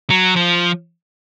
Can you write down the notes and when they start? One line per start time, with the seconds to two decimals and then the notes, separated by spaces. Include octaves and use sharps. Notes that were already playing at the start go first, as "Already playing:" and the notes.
0.10 F#3
0.36 F3